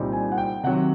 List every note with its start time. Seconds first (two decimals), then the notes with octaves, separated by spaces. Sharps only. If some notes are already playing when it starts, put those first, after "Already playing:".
Already playing: C2 A#2 G3 C4 D#4
0.13 G#5
0.32 F#5
0.38 G5
0.63 C3 D#3 F#3 F#5